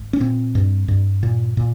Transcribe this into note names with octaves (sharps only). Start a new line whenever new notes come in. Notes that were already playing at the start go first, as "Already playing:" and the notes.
Already playing: G#1
C#4
A#2 C4
G2
G2
A#2
A#2